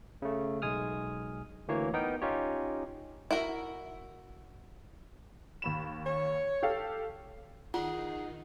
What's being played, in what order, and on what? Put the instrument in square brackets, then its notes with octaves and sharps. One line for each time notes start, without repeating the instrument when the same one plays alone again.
[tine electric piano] C#3 A3
B1 G#3 G#5 D#6 F6
D2 E3 A#3 C#5
B3 D#4 A#4 G5
C#4 D#4 F4 G4 C#5
[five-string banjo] E4 F#4 A#4
[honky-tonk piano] D#2 B5 E7
[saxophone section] C#5
[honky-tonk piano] G4 A4 F5
[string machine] D#3 D#4 [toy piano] F4 [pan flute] G#4 [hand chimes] F#5